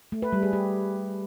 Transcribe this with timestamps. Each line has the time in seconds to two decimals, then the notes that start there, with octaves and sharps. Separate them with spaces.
0.12 A3
0.22 B4
0.33 G3
0.43 G#4
0.53 G4